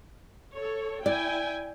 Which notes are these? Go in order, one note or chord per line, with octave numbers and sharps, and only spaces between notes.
A4 C#5
E4 D5 G5 G#5